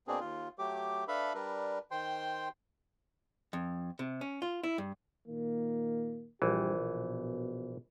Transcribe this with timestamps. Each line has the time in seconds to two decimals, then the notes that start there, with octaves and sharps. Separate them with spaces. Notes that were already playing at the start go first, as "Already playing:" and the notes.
0.08 B2 A#3 C4 D4 G#4
0.20 D#2 F4
0.59 F#3 A3 G4 D6
1.08 D4 A4 B4 E5 F5 B5
1.35 G3 D4 A#4 B4
1.91 D#3 C5 G5 C6
3.53 F2
3.99 C3
4.21 C#4
4.42 F4
4.63 E4
4.78 G2
5.28 A#2 D#3 A#3
6.42 A#1 G2 E3 G3 G4
6.77 B2